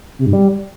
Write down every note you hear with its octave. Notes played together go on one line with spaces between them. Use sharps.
C3
G2
G3